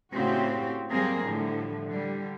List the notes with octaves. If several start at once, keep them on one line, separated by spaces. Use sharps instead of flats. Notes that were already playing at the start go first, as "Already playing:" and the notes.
A2 C#3 C4 F#4 G4
F#3 G3 A#3 C4 G#4 A#4
A2 D3 F3 G3
D3 G3